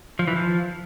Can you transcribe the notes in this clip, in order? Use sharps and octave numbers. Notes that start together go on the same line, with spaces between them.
F3
E3
F3